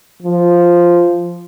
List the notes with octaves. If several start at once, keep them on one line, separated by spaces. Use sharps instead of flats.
F3